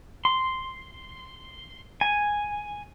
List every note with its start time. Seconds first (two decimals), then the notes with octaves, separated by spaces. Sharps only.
0.25 C6
2.01 G#5